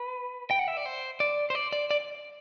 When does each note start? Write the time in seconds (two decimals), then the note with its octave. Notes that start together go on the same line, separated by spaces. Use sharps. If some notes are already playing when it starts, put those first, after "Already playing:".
Already playing: B4
0.51 G5
0.59 F#5
0.68 E5
0.77 D5
0.86 C5
1.20 D5
1.50 C5
1.55 D5
1.73 D5
1.91 D5